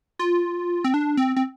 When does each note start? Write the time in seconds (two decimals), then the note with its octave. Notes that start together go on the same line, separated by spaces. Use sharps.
0.19 F4
0.84 C4
0.94 D4
1.17 C4
1.37 C4